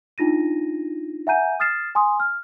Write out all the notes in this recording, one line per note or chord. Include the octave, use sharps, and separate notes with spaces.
D4 D#4 F4 A#6 D#7
E5 F#5 G#5 A#5 G6 D#7
D#6 F6 A6 C7 E7
G#5 C6 D#6
F6